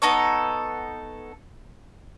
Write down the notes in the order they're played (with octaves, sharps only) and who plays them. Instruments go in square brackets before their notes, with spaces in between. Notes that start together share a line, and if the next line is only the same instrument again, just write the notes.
[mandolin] B3 D#4 A4 C#5